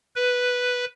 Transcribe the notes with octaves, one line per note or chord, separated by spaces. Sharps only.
B4